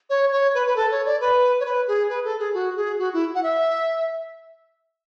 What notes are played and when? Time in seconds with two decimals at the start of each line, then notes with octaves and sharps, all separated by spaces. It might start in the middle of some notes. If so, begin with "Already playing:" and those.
0.10 C#5
0.32 C#5
0.54 B4
0.67 B4
0.76 A4
0.91 C#5
1.06 D5
1.21 B4
1.60 C#5
1.65 B4
1.88 G#4
2.09 B4
2.25 A4
2.40 G#4
2.54 F#4
2.76 G#4
2.99 F#4
3.13 E4
3.35 F#5
3.43 E5